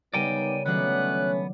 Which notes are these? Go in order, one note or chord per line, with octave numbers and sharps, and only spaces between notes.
C#3 G3 B3 D#4 A#4 D5 G5 G#5
D#3 F#3 A3 B3 C#4 D4 F#6